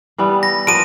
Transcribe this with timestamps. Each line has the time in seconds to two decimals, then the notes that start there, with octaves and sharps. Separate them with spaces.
0.18 E3 G3 B3
0.43 A#6
0.67 F3 A#3 B3 D7 D#7